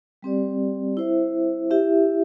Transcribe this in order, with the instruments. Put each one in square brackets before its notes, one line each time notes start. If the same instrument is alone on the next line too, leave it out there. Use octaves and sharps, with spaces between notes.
[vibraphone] G3 C4 G4 D5
E4 C5 E5
E4 G4 E5